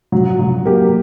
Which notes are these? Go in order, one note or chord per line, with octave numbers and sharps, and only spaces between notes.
F#3
F#3
A#3 G4